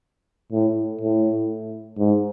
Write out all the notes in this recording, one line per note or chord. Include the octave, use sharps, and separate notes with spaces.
A2
A2
G#2